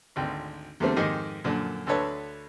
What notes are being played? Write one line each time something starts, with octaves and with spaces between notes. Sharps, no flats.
G#1 D2 G5
E2 D3 G3 A3 A#3 C4
F2 G#2 D#3 G4 G#4 D#5
F#2 A#2 D3 F3
D2 D3 A4 B4 C#5 A5